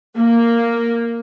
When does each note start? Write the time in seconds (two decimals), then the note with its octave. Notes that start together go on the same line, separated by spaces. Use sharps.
0.15 A#3